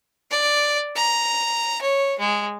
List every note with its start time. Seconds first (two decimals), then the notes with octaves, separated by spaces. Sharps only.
0.31 D5
0.96 A#5
1.81 C#5
2.19 G#3